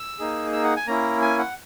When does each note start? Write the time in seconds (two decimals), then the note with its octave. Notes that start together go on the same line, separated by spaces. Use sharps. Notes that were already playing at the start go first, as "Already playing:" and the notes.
Already playing: E6
0.19 A#3 D#4 G#4
0.52 E6
0.64 F#5
0.76 G#5
0.87 A#3 C#4 E4 A#5
1.22 G#5
1.39 F#5